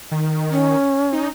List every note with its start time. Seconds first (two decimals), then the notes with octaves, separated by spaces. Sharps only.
0.11 D#3
0.50 C#4
1.12 D#4